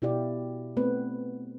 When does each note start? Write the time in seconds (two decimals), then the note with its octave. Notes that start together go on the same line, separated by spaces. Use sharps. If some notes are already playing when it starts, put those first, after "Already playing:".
0.02 B2 E4 G4 D5 F5
0.77 A3 B3 C4 B4